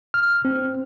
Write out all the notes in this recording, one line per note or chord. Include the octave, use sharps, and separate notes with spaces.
F6
C4